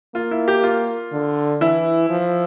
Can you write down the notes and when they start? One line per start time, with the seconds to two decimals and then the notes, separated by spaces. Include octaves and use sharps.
0.15 A#3 F4
0.31 E4
0.48 G4
0.63 F4
1.12 D3
1.61 E3 E4
2.10 F3